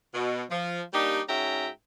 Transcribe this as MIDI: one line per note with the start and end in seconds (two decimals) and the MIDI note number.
0.14 0.43 47
0.50 0.81 53
0.93 1.21 55
0.93 1.21 58
0.93 1.21 62
0.93 1.21 63
0.93 1.21 67
1.28 1.68 44
1.28 1.68 61
1.28 1.68 66
1.28 1.68 76
1.28 1.68 79
1.28 1.68 82